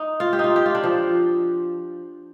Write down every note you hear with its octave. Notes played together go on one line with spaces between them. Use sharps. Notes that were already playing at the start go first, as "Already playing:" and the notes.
Already playing: D#4
F4
G4
D#4 F4
G4
F4
D4
F3